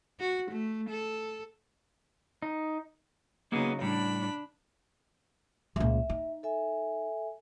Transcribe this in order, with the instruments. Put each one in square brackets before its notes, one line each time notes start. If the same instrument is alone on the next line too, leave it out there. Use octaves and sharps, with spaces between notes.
[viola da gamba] F#4
A3
A4
[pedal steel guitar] D#4
[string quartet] C#3 F#3 D#4 [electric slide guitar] A#3 B3 G#4
[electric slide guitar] A2 G3 [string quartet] D4 B5
[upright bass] C#2 A#2 [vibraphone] E5
[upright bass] D#4
[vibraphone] A4 E5 G#5